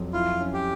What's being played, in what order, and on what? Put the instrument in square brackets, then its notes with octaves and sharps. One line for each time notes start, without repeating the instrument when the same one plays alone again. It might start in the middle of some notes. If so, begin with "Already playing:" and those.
Already playing: [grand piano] F2 F#3
[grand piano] E4 [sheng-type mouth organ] F4
[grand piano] C#4
[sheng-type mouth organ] G4